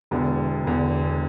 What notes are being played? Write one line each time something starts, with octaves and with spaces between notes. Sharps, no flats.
E1 E2 D3
E1 E2 D3